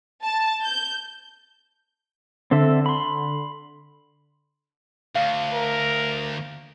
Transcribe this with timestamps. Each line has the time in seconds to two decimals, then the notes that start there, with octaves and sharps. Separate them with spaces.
0.23 A5
0.63 G6
2.51 D3 C4 A4 E5
2.86 B5 C6
5.15 D2 F5
5.53 A#4